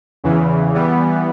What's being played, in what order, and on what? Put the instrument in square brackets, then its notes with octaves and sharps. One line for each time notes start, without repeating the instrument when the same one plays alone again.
[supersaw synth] E2 C#3 E3
E3 G3 B3